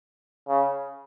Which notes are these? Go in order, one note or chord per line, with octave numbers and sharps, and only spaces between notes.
C#3